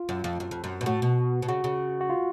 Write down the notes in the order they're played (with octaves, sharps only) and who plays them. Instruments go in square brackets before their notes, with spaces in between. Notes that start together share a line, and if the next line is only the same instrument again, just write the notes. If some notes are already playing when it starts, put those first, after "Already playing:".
Already playing: [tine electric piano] F4
[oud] F#2
F2
F#2
F2
F#2
B2
[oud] A2 [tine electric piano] F#4
[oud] B2
B2
[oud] C#3 [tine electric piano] F#4
[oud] C#3
[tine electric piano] F#4
F4